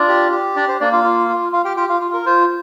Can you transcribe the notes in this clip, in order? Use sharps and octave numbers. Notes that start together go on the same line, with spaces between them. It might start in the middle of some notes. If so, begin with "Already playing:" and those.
Already playing: D4 F4 D5
G4
G4
D4 D5
C5
A#3 D4 D5
F4 F5
F4
F4
F4 F5
G4 G5
F4 G4 G5
F4 F5
F4
A#4
F4 C5